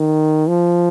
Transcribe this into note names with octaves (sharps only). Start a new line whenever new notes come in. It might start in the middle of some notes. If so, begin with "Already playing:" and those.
Already playing: D#3
F3